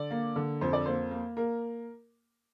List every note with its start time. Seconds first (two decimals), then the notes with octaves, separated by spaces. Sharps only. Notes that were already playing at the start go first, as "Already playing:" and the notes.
Already playing: D3 D5
0.11 A#3
0.36 D3
0.61 F2 C5
0.73 D5
0.86 A#3 C5
1.11 A#3
1.37 A#3 A#4